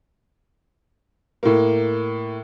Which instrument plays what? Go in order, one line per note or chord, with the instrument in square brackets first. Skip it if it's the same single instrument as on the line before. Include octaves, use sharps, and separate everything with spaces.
[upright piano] A2 A#3